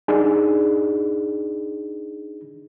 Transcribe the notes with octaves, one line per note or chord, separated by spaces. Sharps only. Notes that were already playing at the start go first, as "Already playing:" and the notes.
D4 D#4 G#4